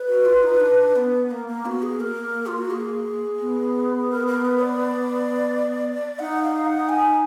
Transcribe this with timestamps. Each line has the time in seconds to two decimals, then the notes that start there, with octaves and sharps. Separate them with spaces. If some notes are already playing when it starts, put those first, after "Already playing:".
Already playing: B4
0.08 F#4
0.25 F4
0.43 D#4
0.60 D4
0.96 B3
1.30 A#3 A#4
1.48 A#3
1.65 B3 F#4
1.83 G#4
2.00 A#3 A#4
2.46 F4
2.58 F#4
2.70 G#4
3.40 B3
4.10 A#4
4.27 A#4
4.45 B4
4.62 D5
6.19 D#4 F#5
6.42 F5
6.66 F#5
6.89 G#5